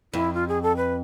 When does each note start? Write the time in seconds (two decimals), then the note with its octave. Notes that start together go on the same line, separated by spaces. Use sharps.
0.13 F2 E4
0.34 F4
0.48 G#4
0.63 A4
0.77 B4